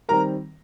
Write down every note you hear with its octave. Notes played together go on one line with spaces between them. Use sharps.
D#3 G3 C4 A#4 A#5